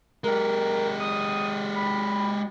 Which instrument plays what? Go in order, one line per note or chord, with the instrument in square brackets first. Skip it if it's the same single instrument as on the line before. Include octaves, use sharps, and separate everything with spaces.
[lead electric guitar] G#3 G4 [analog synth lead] A#4
[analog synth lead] D#6
B5